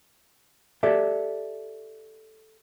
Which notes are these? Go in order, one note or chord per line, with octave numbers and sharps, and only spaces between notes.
G4 A4 D5 E5